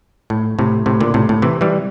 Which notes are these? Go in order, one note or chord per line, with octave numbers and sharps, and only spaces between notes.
A2
A2 C3
A2 C3
A#2 D3
A2 C3
A2
C3 E3
E3 G3